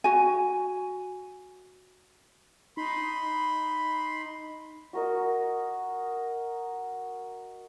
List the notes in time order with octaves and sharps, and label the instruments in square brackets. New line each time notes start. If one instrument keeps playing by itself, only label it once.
[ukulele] F#4 G#5
[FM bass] D#4 [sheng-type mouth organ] B5 C6
[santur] F#4 A#4 D#5